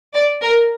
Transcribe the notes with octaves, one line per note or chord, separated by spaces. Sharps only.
D5
A#4